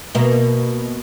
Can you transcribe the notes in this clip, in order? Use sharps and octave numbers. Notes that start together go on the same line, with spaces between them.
B2 A#3